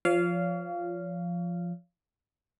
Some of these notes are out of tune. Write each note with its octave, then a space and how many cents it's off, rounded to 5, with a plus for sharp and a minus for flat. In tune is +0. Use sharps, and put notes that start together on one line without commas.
F3 +0 C#5 +40 F5 -10